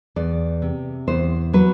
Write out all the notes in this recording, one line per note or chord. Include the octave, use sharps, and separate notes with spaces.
E2 D5
C3
E2 C5
F#3 B4